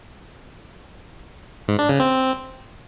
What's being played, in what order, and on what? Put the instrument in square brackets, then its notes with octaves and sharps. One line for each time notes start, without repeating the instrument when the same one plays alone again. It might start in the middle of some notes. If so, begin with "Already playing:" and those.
[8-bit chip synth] G#2
D4
C#3
C4